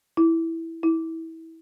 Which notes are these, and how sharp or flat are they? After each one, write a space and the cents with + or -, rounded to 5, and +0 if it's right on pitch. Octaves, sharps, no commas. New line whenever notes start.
E4 -5
E4 -25